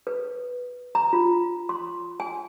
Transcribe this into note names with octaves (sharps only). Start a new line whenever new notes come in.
B4
A#5
F4
C6
G#5